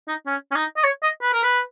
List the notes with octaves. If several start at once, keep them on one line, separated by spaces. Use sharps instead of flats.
D#4
C#4
C#4
D#4
D#5
C#5
D#5
B4
A#4
B4